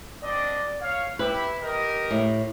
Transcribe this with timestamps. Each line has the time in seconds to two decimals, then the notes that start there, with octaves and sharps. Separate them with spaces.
0.23 C4 D4 D5 D#5
0.81 C#5 F5
1.19 E4 G4 B4
1.62 G4 A#4 D#5
2.11 A2